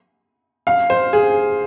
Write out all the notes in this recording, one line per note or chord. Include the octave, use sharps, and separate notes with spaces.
F5
C5
G#4